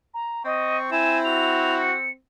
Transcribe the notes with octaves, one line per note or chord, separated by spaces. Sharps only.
A#5
C4 D#5 C#6
E4 G#5 E7
F#4 F7
C#7